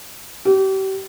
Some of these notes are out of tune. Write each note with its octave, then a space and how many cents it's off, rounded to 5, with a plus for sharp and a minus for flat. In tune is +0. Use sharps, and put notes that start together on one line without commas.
G4 -35